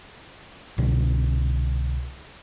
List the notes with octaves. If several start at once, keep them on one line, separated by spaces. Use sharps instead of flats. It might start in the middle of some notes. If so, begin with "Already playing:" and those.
C2 B2 D3